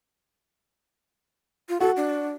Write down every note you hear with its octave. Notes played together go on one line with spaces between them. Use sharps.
F4
F#4 A4
D4